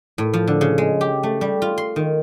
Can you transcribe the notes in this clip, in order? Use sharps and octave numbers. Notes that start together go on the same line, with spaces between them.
A2
F3
D3
C#3
G#3
G4
A3
G3
F4
C6
D#3